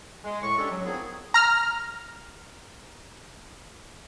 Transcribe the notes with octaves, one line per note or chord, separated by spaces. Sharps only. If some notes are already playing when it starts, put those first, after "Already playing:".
G#3
A2 C#6
D3 G3 G#3 C#4 D4 A4
F#3
D#3 F3 B3 C4 E4 G#4
A#5 F6